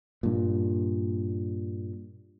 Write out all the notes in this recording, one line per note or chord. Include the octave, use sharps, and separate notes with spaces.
G2 A#2